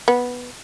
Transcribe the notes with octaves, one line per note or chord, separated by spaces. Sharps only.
B3